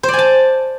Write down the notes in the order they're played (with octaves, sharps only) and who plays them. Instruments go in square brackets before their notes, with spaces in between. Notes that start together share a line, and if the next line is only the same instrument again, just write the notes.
[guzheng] C5
D5
G#5
A5